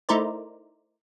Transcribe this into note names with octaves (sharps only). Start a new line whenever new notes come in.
A3 D#4 E4 A#4 C5 D5